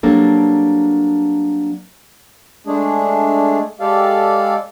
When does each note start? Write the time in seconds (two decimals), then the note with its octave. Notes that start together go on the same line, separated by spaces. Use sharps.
0.03 F#3 G3 A#3 C4 D4 A4
2.67 G#3 A3 D4 G#4
3.80 G#3 G4 A4 D5 F5